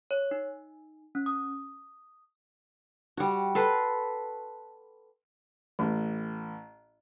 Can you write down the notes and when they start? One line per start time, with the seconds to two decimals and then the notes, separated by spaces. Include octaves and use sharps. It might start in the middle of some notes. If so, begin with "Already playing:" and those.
0.11 C#5
0.31 D#4
1.15 C#4
1.26 D#6
3.17 G3 F#4
3.55 A4 B4 C6
5.79 A1